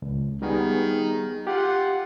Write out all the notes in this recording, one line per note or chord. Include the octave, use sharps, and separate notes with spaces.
C#2
D#3 G3 B3 G#4
F4 G4 F#5